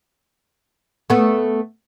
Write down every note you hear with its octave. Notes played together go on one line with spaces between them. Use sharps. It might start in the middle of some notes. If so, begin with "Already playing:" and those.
A3 B3